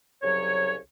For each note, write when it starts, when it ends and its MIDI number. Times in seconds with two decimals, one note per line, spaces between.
0.22 0.75 36
0.22 0.75 49
0.22 0.75 54
0.22 0.75 73